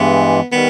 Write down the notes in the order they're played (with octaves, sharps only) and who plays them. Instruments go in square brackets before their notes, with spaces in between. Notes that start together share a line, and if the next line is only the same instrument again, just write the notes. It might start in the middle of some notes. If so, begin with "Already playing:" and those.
Already playing: [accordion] G2 E3 G#3 [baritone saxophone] B3
[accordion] D#3 G3 [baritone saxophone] B3